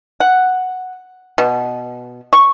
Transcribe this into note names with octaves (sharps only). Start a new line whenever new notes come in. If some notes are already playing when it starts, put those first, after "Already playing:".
F#5
B2
C#6